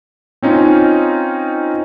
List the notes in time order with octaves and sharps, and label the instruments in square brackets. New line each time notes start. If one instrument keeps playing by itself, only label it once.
[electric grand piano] C4 C#4 D#4 F4